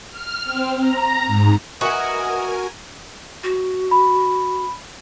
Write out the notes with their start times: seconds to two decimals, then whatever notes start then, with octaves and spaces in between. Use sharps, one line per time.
0.11 F6
0.45 C4
0.80 A#5
1.27 G#2
1.81 F#4 A#4 B4 D#5 E5 F#5 G#5
3.44 F#4
3.91 B5